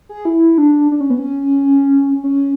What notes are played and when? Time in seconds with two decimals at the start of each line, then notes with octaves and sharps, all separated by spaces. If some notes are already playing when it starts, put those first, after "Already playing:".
0.09 G#4
0.25 E4
0.58 D4
0.92 D4
1.01 C#4
1.10 B3
1.19 C#4
2.24 C#4